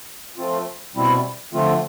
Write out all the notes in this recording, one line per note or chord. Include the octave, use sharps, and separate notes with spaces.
F3 A3 C4 F4
B2 G3 C4 E4
D3 F3 A3 C4 F4